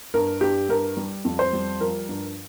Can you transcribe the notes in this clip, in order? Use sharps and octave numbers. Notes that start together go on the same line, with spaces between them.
G2 A#4
G2 G4
G2 A#4
G3
F2
C5
G3
F3 A#4
G2